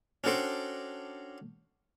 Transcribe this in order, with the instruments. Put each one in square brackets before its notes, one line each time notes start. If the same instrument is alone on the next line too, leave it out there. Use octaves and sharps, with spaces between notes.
[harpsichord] C#4 D4 F#4 A4 C5 G5